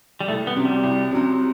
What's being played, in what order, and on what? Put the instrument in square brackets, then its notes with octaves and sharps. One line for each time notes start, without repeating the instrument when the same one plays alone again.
[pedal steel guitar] G3
[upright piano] C2 [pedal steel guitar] A3
[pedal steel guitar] B3
[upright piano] C3 F#3 C4
[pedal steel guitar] G3
[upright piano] C2
C3 F#3 C4